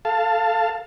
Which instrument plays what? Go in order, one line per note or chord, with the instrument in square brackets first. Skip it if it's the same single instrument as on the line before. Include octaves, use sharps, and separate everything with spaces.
[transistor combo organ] A4 F5 A5